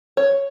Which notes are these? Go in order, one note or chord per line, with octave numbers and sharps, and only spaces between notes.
C#5